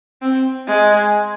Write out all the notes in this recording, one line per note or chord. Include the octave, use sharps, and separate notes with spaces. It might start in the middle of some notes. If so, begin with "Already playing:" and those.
C4
G#3